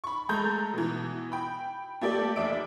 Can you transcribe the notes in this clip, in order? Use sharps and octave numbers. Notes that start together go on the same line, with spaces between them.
B5 C#6
G#3 A3 A4 A#5 B5 G6
B2 E3
G5 B5
A3 A#3 G4 A4 D5
F1 D5 E5 D7